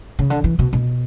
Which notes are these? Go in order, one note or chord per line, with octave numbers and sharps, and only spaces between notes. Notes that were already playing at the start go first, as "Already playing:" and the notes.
C#3
D3
E3
B2
B2